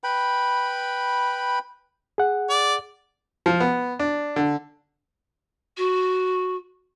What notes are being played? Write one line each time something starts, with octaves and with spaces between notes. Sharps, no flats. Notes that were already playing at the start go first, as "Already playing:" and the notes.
B4 G5 B5
G#4 F#5
D5
F3
B3
D4
D3
F#4